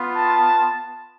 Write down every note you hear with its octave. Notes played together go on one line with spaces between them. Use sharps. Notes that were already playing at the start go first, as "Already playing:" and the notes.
Already playing: B3 F4
A5